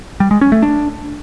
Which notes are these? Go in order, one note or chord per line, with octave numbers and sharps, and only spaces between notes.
G3
G#3
C#4
A3
D4